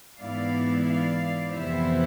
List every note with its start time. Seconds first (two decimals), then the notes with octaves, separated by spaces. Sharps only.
0.19 G#2 E3 B3 E4 D5 F5
0.87 D5 F5
1.54 F2 C3 E3 B3 E4 C5 E5